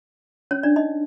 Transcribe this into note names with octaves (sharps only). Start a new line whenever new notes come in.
C#4 C#5
D4 D5
D#4 D#5